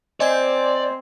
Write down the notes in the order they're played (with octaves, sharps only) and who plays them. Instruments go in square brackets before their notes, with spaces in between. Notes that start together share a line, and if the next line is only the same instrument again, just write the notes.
[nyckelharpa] C4 [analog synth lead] C5 [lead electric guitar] D5 [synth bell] D#5 G#5 G#6